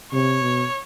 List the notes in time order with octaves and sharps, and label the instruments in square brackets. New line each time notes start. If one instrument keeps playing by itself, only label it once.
[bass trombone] C3 [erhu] C#5
[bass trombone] B2